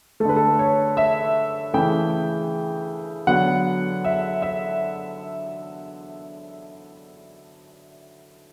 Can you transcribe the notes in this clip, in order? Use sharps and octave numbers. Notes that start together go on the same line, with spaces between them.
D3 A3 A4 B4
A4
C#5
E5
C#3 E3 A3 G5
D3 F#3 B3 F#5
E5
E5